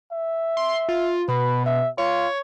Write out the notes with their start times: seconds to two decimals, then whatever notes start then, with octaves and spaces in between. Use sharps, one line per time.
0.12 E5
0.57 C6
0.89 F4
1.28 B2 B4
1.66 E5
1.98 F4 C#5